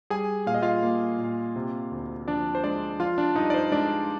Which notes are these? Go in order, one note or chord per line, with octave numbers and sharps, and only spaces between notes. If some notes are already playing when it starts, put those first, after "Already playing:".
G3 G#4 G#5
A#2 F5
D#5
F4 F5
A#3
A#2
C3
D2
F3 D4 D5
C5
G#3 D4 D5
F3 F4 F5
D4 D5
G2 D#4 D#5
D5
C5
G#3 D4 D5